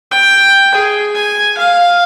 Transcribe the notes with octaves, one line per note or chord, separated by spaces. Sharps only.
G5
G#4
G#5
F5